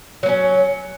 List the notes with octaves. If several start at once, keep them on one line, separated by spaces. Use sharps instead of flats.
F#3 A#3 C#4